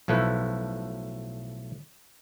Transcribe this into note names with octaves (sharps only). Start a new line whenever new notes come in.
B1 A2 F3 A3 B4